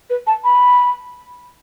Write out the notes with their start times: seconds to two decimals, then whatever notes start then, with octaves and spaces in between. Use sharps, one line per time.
0.10 B4
0.27 A5
0.44 B5